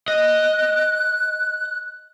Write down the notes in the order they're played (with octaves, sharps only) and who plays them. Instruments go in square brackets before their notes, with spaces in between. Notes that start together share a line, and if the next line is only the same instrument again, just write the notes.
[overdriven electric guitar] D#5 [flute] F#6